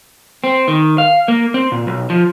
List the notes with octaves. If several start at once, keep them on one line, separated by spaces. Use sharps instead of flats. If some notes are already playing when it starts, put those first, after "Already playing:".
C4
D#3
F5
A#3
C4
A#2
B1
F3